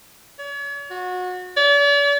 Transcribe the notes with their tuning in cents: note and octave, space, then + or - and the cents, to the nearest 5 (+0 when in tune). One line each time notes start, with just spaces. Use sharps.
C#5 +40
F#4 -30
D5 -45